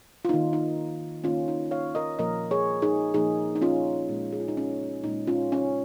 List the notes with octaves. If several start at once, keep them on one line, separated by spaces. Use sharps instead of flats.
F4
D#3 A#3 D#4
D#4
D#3 A#3 C#4 F4
D#4
C#5 F5
A#4 D#5
A#2 F3 A#3 A#4 D#5
G#4 C#5
D#4 G#4
A#2 F3 A#3 D#4 G#4
D#4
C#4 F4
A#2 G#3
G#4
F4
D#4
C#4
A#2 G#3 D#4
C#4 F4
C#4